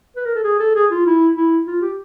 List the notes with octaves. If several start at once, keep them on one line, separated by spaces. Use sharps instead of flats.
B4
A#4
A4
G#4
A4
G#4
F4
E4
E4
F4
G4